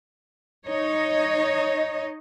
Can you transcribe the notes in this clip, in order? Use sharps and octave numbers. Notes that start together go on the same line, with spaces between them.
D#4 C#5 D#5